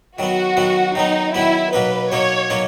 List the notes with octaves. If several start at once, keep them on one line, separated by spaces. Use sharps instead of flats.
D#3 F#3 B3 F#4
D#3 F#3 B3
D#3 F#3 B3 D#4
D#3 F#3 B3 E4
B2 F#3 A#3 D#4 B4
B2 F#3 A#3 D#4 C#5
B2 F#3 A#3 D#4